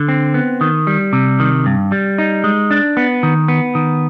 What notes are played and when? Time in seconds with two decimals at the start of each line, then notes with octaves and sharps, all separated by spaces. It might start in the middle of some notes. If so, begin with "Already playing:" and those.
Already playing: D3
0.08 C4
0.34 B3
0.61 D#3
0.87 G3
1.13 C3
1.40 D#3
1.66 G2
1.92 G3
2.18 D#4
2.44 G#3
2.71 D4
2.97 B3
3.23 D#3
3.48 B3
3.75 D#3